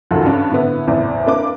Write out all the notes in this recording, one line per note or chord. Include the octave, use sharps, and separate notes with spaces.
C#2 F#2 D#3 F3 F#4 A4
G2 C#4 D4
A2 D3 B3 E4
F#1 E2 A2 E4 D5
A#3 D4 B4 D6